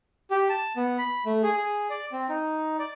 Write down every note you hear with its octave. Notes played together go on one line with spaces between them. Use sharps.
G4
A5
B3
B5
A3
G#4
G#4
D5
C4
D#4
D5